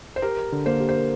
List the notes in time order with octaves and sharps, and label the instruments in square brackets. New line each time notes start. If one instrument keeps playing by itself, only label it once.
[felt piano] C5
[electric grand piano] G4 [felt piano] A#4
[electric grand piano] A#4
D3
[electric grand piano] A#3 [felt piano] C5
[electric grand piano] G4
[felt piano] C5
[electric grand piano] A#4